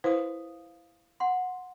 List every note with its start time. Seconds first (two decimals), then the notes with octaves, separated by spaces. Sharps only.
0.04 E4 B4 C5 F5 D#6
1.20 F#5 C6